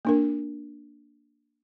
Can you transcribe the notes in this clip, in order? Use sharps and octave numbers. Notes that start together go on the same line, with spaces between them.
A#3 D4 A#4